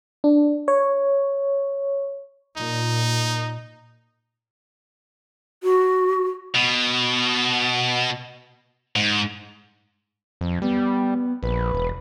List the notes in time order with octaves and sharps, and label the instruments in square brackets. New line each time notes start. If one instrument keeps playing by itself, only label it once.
[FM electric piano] D4
C#5
[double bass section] A#2 [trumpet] D#4
[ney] F#4
[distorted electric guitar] B2
G#2
[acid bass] F2
[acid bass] G3 [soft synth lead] B3
[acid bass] A#1 [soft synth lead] B4
[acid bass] E1